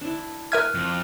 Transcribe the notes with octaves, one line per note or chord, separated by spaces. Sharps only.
D4 E4
A#4 E5 F6 F#6 G#6 D#7
F2